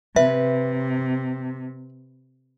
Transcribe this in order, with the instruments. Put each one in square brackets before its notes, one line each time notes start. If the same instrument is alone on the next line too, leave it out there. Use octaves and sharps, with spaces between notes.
[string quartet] C3 [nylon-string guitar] B4 [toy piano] E5